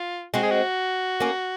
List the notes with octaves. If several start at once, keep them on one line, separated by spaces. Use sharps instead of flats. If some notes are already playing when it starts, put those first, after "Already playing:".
Already playing: F4
G#3 C4 F#4
G#4
F#4
A#3 C#4